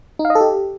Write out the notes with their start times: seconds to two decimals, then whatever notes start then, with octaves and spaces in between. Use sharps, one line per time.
0.19 D#4
0.25 F5
0.30 D#5
0.35 A4
0.41 G4